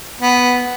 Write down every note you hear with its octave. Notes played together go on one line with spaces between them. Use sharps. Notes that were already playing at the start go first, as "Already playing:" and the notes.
B3